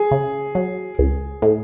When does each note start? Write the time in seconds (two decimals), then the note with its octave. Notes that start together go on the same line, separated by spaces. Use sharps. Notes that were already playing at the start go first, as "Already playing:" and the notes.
Already playing: G#4
0.11 C#3
0.55 F#3
0.99 C#2
1.42 A2